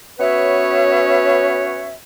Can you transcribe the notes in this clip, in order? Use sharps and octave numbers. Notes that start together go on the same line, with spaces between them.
B3 C#4 F#4 B4 C#5 E5